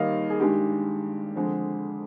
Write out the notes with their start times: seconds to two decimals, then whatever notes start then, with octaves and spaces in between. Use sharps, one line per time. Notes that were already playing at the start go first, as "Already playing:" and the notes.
Already playing: D#2 D#3 G3 A#3 D#5 F5
0.30 G#4
0.40 G2 D#3 G#3 G4
1.36 F2 D3 G#3